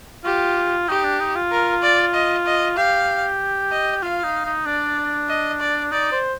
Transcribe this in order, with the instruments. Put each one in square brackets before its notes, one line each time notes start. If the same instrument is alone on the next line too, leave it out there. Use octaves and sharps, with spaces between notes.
[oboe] F4 [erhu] G4
[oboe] D#4 [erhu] G4
[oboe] D4
D#4
F4
[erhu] A#4
D5
D#5
D#5
[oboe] G4 [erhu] F5
[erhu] D#5
[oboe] F4 [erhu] F5
[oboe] D#4
D#4
[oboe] D4 [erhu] D5
[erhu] D#5
D5
[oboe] D#4 [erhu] D5
[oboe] C5